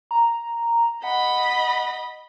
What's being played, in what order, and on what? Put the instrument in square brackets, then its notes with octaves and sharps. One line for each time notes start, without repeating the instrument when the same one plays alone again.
[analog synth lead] A#5
[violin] D#5 B5 [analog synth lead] F#5